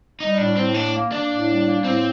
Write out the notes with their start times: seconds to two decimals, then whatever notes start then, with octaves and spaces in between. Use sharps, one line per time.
0.20 G3 D#4
0.38 A2 D4
0.56 A2 C4
0.74 A#3 D4
0.93 A#3
1.12 A#3 D4
1.30 A2
1.48 G3
1.66 A#3
1.84 A2 C4